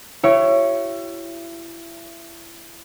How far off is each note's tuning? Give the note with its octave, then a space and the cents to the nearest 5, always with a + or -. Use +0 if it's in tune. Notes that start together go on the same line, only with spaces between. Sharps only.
E4 +30 G4 -45 C#5 +0